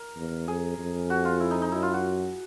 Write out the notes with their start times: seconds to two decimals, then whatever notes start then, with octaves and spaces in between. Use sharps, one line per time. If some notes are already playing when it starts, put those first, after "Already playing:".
Already playing: A#4
0.16 E2
0.48 F2 G#4
0.78 F2
1.10 F#4
1.25 F4
1.40 E4
1.51 D#4
1.62 D#4
1.72 F#2 E4
1.83 F4
1.93 F#4